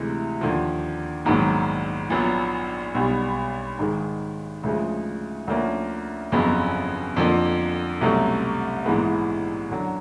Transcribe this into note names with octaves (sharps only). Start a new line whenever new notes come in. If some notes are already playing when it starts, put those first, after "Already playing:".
Already playing: D2 C3 E3 G#3
D#2 D3 F3
A#1 G#2 D#3 F#3 B3
A#1 A#2 F#3 B3
B1 B2 G3 B3
G#2 D#3 G#3
D2 C#3 F3 G#3
D2 D3 F3 A#3 C#4
G1 F2 C#3 F#3 B3
F2 D3 F3 A#3
C2 B2 F#3 A3 C#4
A#1 G#2 E3 G#3 B3
F#2 D3 F#3